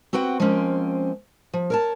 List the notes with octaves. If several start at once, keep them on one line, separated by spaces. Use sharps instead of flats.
C4 F#4 B4 F#5 G5
F3 G#3 A#3 C4 C#4
F3
A#4 C#5 A5